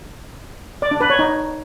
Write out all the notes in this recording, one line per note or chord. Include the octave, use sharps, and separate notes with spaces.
D5
D4
B4
C#5
D#4